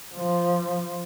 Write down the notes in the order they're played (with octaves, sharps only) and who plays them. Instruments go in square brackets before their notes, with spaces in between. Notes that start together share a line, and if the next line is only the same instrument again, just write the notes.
[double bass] F3